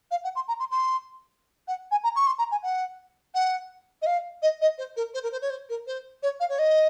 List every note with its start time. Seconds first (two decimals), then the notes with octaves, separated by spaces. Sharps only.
0.11 F5
0.24 F#5
0.35 C6
0.48 A#5
0.59 C6
0.71 C6
1.68 F#5
1.91 G#5
2.03 A#5
2.16 C#6
2.27 C6
2.38 A#5
2.51 G#5
2.63 F#5
3.34 F#5
4.02 D#5
4.06 F5
4.42 D#5
4.61 D#5
4.78 C5
4.96 A#4
5.14 C5
5.23 A#4
5.32 C5
5.42 C#5
5.50 C5
5.69 A#4
5.87 C5
6.22 C#5
6.40 F5
6.49 C#5
6.59 D#5